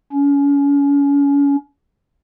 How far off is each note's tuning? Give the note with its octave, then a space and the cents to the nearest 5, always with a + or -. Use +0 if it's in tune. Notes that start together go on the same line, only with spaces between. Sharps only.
C#4 +35